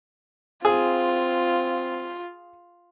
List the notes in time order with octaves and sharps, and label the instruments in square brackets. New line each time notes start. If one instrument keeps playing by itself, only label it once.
[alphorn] C4 [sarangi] F4 [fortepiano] G#4